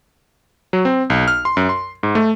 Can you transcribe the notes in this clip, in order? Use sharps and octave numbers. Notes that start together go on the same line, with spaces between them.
F#3
C4
B1
F6
C6
F#2
C6
G#2
A3